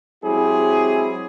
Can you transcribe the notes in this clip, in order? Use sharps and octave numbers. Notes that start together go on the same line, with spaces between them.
F#3 G#3 C4 E4 G4 G#4